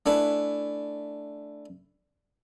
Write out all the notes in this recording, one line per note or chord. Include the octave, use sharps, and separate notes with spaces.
A3 D4 E4 B4 G#5